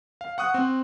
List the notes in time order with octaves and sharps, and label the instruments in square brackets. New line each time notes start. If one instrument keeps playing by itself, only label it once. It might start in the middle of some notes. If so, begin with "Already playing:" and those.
[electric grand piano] F5
F#5 C#6 D#6 F#6
C4